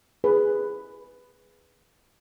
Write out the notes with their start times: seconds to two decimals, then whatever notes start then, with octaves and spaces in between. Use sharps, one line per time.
0.24 G#4 B4